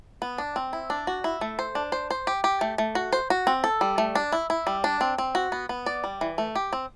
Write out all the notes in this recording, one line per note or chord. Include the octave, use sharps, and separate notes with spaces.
B3
D4
C4
E4
D4
F#4
E4
A3
C5
D4
C5
C5
G4
G4
A3
A3
F#4
C5
F#4
C4
A4
G3
A3
D4
E4
E4
G3
D4
C4
C4
F#4
B3
B3
D5
G3
E3
A3
G4
C4